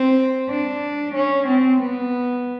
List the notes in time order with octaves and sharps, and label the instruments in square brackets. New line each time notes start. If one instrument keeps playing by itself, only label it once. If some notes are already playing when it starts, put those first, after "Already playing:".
Already playing: [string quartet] C4
D4
C#4
C4
B3